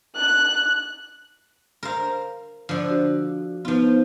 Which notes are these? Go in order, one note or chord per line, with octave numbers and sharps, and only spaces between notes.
F#6
A#4 C5 F5
D3 F3
F#4
F3 B3 D#4 F4 B4